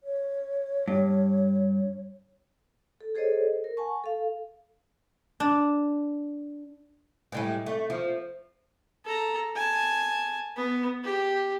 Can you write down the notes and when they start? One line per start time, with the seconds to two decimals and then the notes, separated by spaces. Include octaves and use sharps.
0.04 C#5
0.88 G2
3.01 A4
3.15 G#4 A4 C5 C#5 D#5
3.64 A#4
3.77 F#5 G#5 A5 C#6
4.04 A4 F5
5.40 D4
7.32 A2 G3 G#3
7.66 A3
7.90 F3
9.05 A4 A#5
9.56 G#5 A5
10.56 B3
11.04 G4